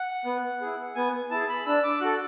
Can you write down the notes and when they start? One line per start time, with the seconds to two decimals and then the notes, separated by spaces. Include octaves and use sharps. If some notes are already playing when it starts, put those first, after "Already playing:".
Already playing: F#5
0.25 B3
0.61 E4 G#4
0.96 B3 G#5
1.31 E4 G#4 A5
1.49 B5
1.66 D4 E6
1.83 D6
2.01 F#4 A4 F#6